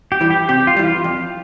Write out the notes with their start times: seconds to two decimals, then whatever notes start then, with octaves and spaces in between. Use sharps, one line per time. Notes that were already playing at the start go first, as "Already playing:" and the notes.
0.12 G4
0.21 E3 G3
0.31 G4
0.49 C3 G4
0.67 F4
0.77 E3 G3
0.86 F4
1.04 F2